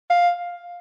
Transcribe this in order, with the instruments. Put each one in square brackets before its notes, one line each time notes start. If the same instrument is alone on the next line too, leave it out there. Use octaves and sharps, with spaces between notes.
[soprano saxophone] F5